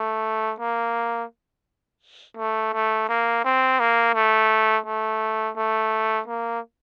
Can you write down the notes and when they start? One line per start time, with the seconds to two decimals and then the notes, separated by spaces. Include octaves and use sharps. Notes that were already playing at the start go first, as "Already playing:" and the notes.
Already playing: A3
0.60 A#3
2.37 A3
2.74 A3
3.09 A#3
3.44 C4
3.80 A#3
4.14 A3
4.86 A3
5.57 A3
6.27 A#3